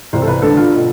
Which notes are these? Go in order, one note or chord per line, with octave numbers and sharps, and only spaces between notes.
C2 C3 E3 C5
A4
B4
G2 D3 A4
F4
B2